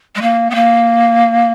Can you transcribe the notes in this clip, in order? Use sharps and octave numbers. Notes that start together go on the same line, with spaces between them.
G#3
A#3
B3
A#3